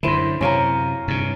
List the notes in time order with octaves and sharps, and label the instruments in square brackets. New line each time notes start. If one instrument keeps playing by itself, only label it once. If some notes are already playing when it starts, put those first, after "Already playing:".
[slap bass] F#2 D3 [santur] E4 C5
[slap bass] F#2 C3 [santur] C#4 F5 A#5
[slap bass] G2 C3